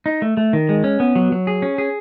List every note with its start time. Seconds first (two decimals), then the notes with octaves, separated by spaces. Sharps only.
0.06 D#4
0.22 A3
0.37 A3
0.53 D#3
0.69 G#3
0.84 C#4
1.00 B3
1.16 F#3
1.32 F#3
1.47 G#4
1.62 C#4
1.78 G#4